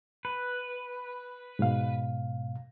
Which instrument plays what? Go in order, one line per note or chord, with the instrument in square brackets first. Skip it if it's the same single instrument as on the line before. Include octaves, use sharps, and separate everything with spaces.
[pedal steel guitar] B4
[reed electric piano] G#2 B2 F5